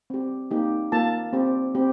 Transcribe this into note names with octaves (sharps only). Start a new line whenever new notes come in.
C4 G4
A#3 D#4 G4
A#3 F4 A5
C4 G4
C4 G4